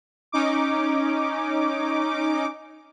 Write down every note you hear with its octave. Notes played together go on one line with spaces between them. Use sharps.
C#4 D#4 D6